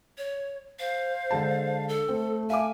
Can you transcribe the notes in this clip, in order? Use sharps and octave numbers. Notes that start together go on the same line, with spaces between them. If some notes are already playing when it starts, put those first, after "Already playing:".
C#5
C5 F5
D3 G#3 A5
A4
A3 C4
E5 F5 G#5 D6